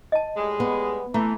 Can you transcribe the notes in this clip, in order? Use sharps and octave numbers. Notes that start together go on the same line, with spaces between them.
D#5 A5
A2 G3 G#3
B3
E3 A3 A#5